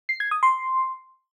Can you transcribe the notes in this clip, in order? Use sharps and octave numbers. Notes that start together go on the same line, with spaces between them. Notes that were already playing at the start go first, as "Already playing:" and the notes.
C7
G#6
D#6
C6